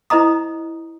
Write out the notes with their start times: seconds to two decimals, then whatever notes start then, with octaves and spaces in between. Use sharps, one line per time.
0.10 E4 C5 D#5 A#5 D#6